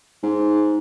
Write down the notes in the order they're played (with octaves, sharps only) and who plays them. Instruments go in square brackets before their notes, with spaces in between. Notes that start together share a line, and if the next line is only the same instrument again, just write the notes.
[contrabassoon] G#2